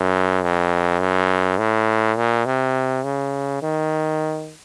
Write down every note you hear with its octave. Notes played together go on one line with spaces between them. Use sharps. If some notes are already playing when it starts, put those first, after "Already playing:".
Already playing: F#2
F2
F#2
A2
A#2
C3
C#3
D#3